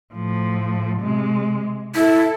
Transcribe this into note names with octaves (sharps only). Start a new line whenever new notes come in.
A2 F3
C3 G#3
E4 A4